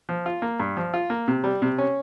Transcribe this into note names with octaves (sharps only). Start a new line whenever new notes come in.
F3
F4
A#3
G2
F3
F4
A#3
C3
G3
C3
C#4